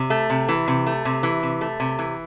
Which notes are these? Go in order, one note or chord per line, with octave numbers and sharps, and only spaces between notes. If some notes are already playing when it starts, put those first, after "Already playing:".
Already playing: C3
A3
C3
E3
C3
A3
C3
E3
C3
A3
C3
E3